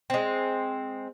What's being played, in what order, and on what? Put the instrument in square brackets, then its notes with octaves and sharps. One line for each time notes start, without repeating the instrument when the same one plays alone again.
[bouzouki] G#3 C4